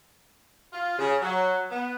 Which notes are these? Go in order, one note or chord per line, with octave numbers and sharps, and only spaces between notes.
F4
C#3
F#3
B3